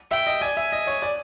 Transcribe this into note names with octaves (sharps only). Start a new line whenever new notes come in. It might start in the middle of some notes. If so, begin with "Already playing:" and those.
E5 G5
D#5
D5 G#5
E5
D#5
C#5
D5